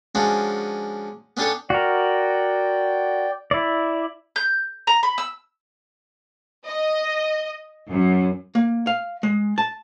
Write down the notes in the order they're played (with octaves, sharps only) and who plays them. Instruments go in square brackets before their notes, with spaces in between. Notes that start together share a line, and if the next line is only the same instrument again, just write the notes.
[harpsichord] F3 G#3 C#4 D4 F#4
B3 C#4 D4 G4 A4 C#5
[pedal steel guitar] F#4 A#4 [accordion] D5 G5
[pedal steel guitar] E4 D5
[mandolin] G6
A#5
B5
E6
[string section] D#5
F#2
[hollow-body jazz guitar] A#3
F5
G#3
A5